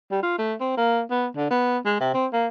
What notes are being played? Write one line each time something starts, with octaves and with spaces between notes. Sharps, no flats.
G3
F4
A3
C4
A#3
B3
D3
B3
G#3
C3
C4
A#3